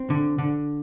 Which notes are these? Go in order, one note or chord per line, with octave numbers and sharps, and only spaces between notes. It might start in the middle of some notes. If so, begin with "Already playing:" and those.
Already playing: C4
D3
D3